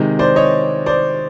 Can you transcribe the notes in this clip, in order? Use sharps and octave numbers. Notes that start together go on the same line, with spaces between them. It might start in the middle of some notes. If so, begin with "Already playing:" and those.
Already playing: C3 D#3 G#3
C5 D5
C#5 D#5
C5 D5